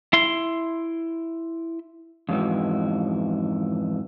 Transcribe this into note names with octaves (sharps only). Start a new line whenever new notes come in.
E4 C6
F2 G#2 E3 F#4